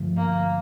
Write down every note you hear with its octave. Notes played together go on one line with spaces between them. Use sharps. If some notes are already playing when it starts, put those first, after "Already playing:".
Already playing: G2 D3 F3 A3
A#3